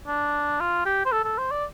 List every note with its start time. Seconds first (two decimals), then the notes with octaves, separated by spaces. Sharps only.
0.07 D4
0.60 F4
0.86 G4
1.05 C5
1.12 A4
1.25 A4
1.38 C5
1.51 D5